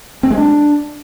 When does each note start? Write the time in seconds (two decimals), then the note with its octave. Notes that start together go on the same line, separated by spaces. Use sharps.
0.23 C4
0.30 G#3
0.37 D4